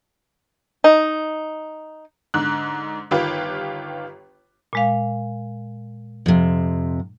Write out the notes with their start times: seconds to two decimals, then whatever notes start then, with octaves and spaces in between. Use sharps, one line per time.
0.84 D#4
2.34 G#2 D3 F#6
3.11 G1 D#3 F4 G4 B4
4.73 A#2 G#3 F5
6.26 F2 C3